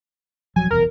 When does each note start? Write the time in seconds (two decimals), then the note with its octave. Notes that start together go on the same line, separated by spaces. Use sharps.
0.56 D#1 F3 F#3 G#5
0.71 F1 B1 E2 A#4